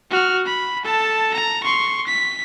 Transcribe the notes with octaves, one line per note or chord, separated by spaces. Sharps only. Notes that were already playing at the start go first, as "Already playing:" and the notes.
F#4 F6
B5
A4 A5
A#5
C6 C#6
B6